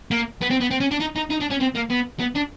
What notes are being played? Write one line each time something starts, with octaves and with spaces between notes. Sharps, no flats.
A#3
B3
C4
B3
C4
C#4
D4
D#4
D#4
D#4
D4
C#4
C4
A#3
B3
B3
D4